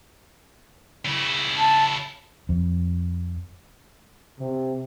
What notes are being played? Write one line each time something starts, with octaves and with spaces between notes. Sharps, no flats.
C#3 E4
A5
F2
C3